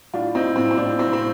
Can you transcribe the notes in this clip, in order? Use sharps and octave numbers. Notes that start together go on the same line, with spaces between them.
A2 D4 F4
A2 C4 D#4
A2 C4
C4
A2 D4
A2 C4
C4